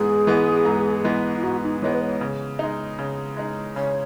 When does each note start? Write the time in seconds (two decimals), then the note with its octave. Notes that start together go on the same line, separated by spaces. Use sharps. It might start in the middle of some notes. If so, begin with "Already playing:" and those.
Already playing: G#2 E3 G#3 B3 G#4
0.27 E3 G#3 B3
0.65 G#2
1.04 E3 G#3 B3
1.35 E4
1.43 G#2 F#4
1.63 D#4
1.82 E3 G#3 B3 C#5
1.94 B4
2.01 C#5
2.21 C#3
2.59 G#3 D#4
2.99 C#3
3.37 G#3 D#4
3.76 C#3 C#5